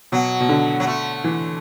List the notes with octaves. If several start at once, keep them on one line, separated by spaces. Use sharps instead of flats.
B2 F#3
B2
D3
F#3
A3
E3